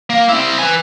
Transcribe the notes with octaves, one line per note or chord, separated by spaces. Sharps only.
A#3
C4 E4
B4 G#5